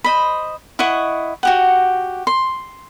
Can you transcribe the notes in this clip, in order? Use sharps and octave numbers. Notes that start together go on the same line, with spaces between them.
C5 D#5 B5
E4 D#5 F#5 C#6
F#4 G4 F#5
C6